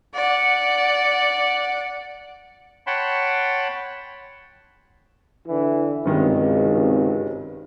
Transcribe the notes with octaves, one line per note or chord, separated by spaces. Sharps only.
D5 F#5
C#5 F#5 G5 A5 B5 C6
D3 E3 E4
G#1 C#2 G2 C3 D#3 G#3